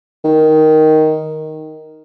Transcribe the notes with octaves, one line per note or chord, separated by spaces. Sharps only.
D#3